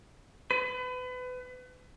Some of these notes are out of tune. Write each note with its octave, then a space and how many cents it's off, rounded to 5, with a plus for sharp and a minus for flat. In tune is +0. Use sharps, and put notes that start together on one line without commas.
B4 +30